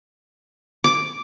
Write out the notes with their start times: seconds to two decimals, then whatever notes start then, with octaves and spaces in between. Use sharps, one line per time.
0.84 D6